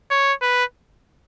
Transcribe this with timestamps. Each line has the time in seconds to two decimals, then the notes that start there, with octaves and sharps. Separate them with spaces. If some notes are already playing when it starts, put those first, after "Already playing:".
0.10 C#5
0.42 B4